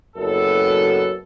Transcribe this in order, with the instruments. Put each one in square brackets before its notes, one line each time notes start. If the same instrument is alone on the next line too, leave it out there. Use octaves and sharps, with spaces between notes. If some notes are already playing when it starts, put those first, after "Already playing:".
[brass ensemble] F#1 F#2 B3 A4